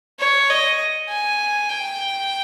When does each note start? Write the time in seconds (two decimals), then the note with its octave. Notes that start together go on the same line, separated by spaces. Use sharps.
0.20 C#5
0.50 D#5
1.09 G#5
1.69 G5